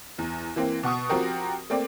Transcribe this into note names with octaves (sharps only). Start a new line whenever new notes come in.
E2
E3 A#3 C4
B2 F#5 C#6 D#6
F3 C4 F#4 G4 A#4
A3 A#3 C4 D5